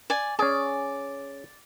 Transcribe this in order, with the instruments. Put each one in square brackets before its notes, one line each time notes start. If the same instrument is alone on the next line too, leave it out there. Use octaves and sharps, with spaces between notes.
[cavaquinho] D5 G#5
[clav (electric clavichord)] C#4 G#4 [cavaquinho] D5